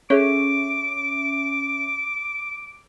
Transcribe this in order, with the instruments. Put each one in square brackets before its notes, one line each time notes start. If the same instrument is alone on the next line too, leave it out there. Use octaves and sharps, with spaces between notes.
[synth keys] C#4 E5 [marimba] G#4 A4 C#5 [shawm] D6